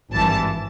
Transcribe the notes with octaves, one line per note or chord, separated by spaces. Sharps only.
G#1 G2 E3 A5